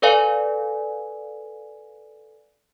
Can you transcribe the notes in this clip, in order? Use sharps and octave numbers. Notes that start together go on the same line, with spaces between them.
A4 B4 D5 F5 G#5